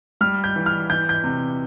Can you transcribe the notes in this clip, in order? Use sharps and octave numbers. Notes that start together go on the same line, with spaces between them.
G3 F6
G6
E3
F6
E3 G6
G6
C3